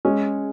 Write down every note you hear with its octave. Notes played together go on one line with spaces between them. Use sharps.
G#3 C#4